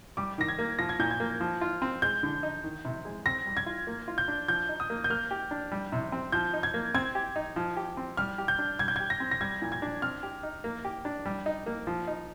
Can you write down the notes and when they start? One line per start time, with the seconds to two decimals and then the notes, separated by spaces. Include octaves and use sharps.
0.17 G3 D6
0.38 D#3 A#6
0.48 G#6
0.59 A#3
0.79 F3 A#6
0.89 G#6
0.99 A#2 G6
1.11 G#6
1.20 A#3
1.40 F3
1.61 F4
1.82 C4
2.02 G#3 G6
2.23 D3
2.43 D#4
2.64 D#3
2.85 C3
3.05 G#3
3.26 C4 A#6
3.46 G3
3.57 G#6
3.66 F4
3.87 A#3
4.08 F4
4.18 G6
4.28 D4
4.48 F3 G6
4.69 D#4
4.80 D#6
4.90 A#3
5.04 G6
5.10 A#3 F6
5.31 G4
5.51 D4
5.72 G3
5.92 C3
6.12 C4
6.32 F3 G6
6.53 D#4
6.63 G#6
6.74 A#3
6.94 C4 G#6
7.15 G4
7.36 D#4
7.56 F3
7.77 G4
7.97 C4
8.17 G3 F6
8.38 G4
8.48 G6
8.59 D4
8.79 G3 G#6
8.88 G6
8.96 G4 G#6
9.10 A#6
9.20 C4
9.31 A#6
9.41 G3 G#6
9.62 A#2
9.72 G#6
9.82 D4
10.02 C4 F6
10.23 G4
10.43 D#4
10.64 A#3
10.85 G4
11.05 D4
11.26 G3
11.46 D#4
11.66 A#3
11.87 F3
12.07 D#4